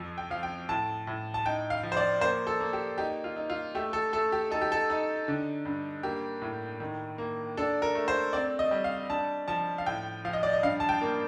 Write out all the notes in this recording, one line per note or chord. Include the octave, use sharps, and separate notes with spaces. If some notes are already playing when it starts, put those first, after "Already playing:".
Already playing: F2 F3
G5
F3 F5
G5
A2 A5
A2
A5
D#4 G5
F5
F3
C5
D5
A#3 C5
A4
A#3
G4
D#4 G4
F4
D#4
F4
A3 G4
A4
A3 A4
G4
D#4 A4
G4
A4
D#4
D3
G2
A#3 G4
A2
D#3
A#3
D4 A4
A#4
A3
C5
C4 D5
D#5
G3
F5
D4 A5
F3 A5
F5
A2 G5
F3 F5
D#5
D5
D#5
G2 F5
A5
G5
A#3